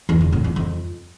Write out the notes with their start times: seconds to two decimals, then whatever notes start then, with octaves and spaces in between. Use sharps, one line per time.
0.09 E2
0.21 D3
0.32 A2
0.44 E2
0.56 F2